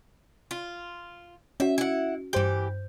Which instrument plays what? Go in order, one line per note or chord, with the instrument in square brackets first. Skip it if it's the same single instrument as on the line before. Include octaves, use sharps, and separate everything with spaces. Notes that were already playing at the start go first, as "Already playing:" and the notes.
[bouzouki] F4
[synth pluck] C#4 F#4 [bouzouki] E5
[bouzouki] E4 F#5
[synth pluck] G2 C5 G6 [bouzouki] E3 G4